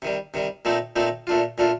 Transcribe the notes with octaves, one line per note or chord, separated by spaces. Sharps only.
C3 D#3 G3
C3 D#3 G3
A#2 A3 C4 D#4
A#2 A3 C4 D#4
A#2 A3 D4 F4
A#2 A3 D4 F4